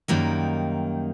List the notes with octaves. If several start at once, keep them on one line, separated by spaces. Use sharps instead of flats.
F#2 D#3 G3 A#3 D#4